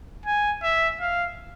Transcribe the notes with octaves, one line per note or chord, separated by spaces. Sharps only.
G#5
E5
F5